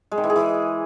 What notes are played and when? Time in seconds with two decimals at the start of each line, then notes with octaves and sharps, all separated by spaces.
0.11 G#3
0.18 D#3
0.24 E3
0.30 G#4
0.36 E3